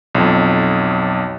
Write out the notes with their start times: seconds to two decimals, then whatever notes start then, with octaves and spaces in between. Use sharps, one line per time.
0.15 B1 F2